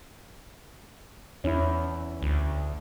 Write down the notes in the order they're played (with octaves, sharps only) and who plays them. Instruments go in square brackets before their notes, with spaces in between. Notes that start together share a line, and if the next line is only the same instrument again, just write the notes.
[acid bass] E2 [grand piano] C#4 E4
[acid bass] D2